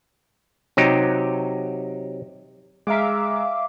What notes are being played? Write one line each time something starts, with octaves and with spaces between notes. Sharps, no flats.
C3 F#3 D#4 G4
G#3 E5 F5 A#5 D6